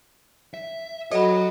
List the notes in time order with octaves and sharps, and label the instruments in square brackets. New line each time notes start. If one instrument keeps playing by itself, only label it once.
[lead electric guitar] E5
[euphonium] F#3 [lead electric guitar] F#4 C#5 [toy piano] A4 B5 [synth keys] D#5